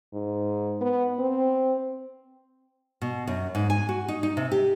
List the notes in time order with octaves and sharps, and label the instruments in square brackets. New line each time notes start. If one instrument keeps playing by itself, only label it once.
[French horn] G#2
B3
C4
[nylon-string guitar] B2
F#2
G#2
G#5
F#4
D#4
D#4
C3
G4